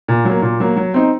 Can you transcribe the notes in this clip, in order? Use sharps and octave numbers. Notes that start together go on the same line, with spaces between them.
A#2
F#3 A#3
A#2
F#3 A#3
F#3
C4 D#4